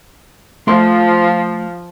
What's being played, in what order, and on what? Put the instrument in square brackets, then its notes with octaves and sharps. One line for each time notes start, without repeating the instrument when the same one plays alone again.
[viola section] F3 [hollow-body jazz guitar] A3 C6